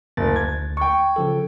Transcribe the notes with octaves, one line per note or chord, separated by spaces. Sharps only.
F#1 D2 A6
G#6
G5 C#6
C#3 F3 A4